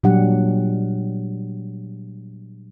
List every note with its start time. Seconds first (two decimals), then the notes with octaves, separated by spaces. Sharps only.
0.03 A#2 F#3 G3 D4 G4 F#5